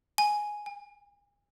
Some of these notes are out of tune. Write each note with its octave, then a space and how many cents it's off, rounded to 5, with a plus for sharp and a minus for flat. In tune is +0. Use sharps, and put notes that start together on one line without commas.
G#5 +5
G#5 -40